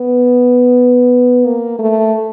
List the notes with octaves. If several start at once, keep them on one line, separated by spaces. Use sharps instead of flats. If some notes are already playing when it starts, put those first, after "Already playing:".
Already playing: B3
A#3
A3